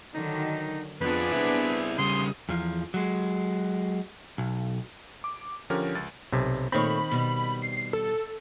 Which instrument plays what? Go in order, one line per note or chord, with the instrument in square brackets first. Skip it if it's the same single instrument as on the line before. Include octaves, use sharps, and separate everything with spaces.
[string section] D3 D#3 F#3 [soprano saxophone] D#4
[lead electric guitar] F2 F3 [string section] B3 D4 G#4 [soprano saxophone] B4
[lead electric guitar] C4 E4
[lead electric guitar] C#3 G3 [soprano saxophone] C6 [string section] D#6
[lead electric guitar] E2 F3
F#3 G#3
B1
[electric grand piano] D6
D3 F3 C#4 G4 A#4
C#2 A6
[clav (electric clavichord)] B1 C3
[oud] A#2 A3 C#5 [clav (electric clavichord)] D#3 C4 [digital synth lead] B5
[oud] B2 G3
[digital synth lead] C7
A4